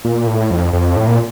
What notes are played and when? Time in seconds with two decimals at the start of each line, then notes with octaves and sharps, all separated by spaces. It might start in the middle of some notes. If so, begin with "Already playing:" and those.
0.05 A#2
0.27 A2
0.51 F2
0.73 F2
0.96 A2
1.07 A#2